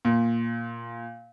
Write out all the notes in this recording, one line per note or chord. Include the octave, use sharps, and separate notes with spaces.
A#2